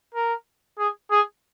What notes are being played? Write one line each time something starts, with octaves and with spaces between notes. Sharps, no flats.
A#4
G#4
G#4